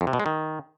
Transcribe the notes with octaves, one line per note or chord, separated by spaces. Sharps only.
F2
C3
B2
G#3
D#3